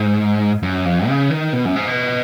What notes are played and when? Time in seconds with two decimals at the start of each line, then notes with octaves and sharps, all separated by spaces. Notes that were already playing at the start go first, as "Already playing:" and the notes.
Already playing: G#2
0.63 F#2
0.85 F2
1.08 C#3
1.30 D#3
1.53 B2
1.65 F#2
1.76 G#2
1.87 B2